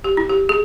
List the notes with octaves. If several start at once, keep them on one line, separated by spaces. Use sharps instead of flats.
G4
E4
G4
G#4